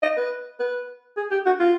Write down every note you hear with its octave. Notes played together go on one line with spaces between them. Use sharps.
D#5
B4
B4
G#4
G4
F#4
F4